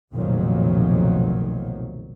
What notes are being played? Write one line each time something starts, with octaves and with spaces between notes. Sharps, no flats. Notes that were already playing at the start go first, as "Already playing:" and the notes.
F1 B1 A#2 D#3 F3 F#3